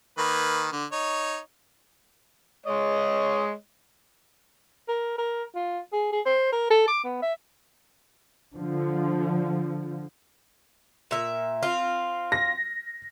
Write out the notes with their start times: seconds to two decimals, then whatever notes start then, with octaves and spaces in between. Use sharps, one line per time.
0.18 D#3 A#3 B4
0.73 D3
0.92 D#4 C#5
2.66 G#3 C#5 D#5
4.88 A#4
5.18 A#4
5.55 F4
5.92 G#4
6.12 G#4
6.25 C5
6.52 A#4
6.70 A4
6.88 D6
7.04 B3
7.22 E5
8.55 D3 F3
11.11 A#2 E5
11.63 C4 F4
12.32 A#6